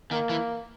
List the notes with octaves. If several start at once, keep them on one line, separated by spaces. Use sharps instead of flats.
D#3 A#3
E3